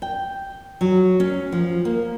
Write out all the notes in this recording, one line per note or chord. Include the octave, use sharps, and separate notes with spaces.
G5
F#3
C#4
F3
A#3